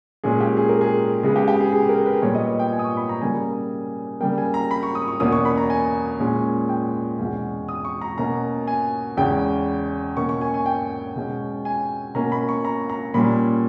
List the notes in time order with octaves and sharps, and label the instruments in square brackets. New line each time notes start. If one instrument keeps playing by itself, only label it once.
[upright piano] A#2 G#3 C#4 G#4
G4
G#4
A#4
G#4
C#3 G#3 B3 G#4
G4
G4
G#4
G#4
A#4
B4
A#2 G3 B3 C#5
D#5
D#5
G5
G#5
D#6
C#6
B5
A#5
C#3 G3 A#3 G#5
C#3 G3 A#3 G5
G#5
A#5
B5
C#6
D#6
C#6
E2 B2 A#3 C#4 D#6
C#6
B5
A#5
G#5
A#2 G#3 C#4
G5
E2 B2 G#3 C#4
D#6
C#6
A#5
B2 A#3 C#4 A#5
G#5
E2 C#3 G#3 C#4 G5
B2 A#3 C#4 C#6
C#6
G#5
G#5
G5
B2 G#3 C#4
G#5
B2 A#3 C#4 A#5
B5
C#6
A#5
A#5
A#2 G3 C#4 B5